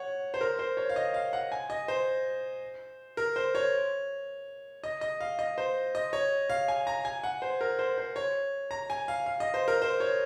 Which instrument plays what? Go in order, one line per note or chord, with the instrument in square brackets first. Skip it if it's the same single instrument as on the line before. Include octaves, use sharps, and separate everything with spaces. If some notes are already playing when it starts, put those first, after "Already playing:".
Already playing: [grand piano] C#5 F#5
C5
A#4
C5
C#5
F5
D#5
F5
F#5
G#5
D#5
C5
A#4
C5
C#5
D#5
D#5
F5
D#5
C5
D#5
C#5
F5
G#5
A#5
G#5
F#5
C5
A#4
C5
C5
C#5
A#5
G#5
F5
F5
D#5
C5
A#4
C5
C#5